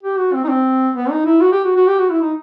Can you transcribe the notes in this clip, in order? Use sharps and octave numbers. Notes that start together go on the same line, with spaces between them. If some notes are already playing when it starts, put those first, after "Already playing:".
G4
F#4
C4
D#4
C4
B3
D#4
E4
F#4
G4
F#4
F#4
G4
F#4
E4
D#4